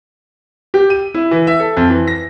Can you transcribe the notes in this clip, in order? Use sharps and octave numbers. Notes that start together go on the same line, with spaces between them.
G4
D#7
E4
E3
E5
A4
F2
E3
A#6